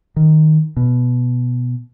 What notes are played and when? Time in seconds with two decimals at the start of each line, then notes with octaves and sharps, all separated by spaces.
0.16 D#3
0.77 B2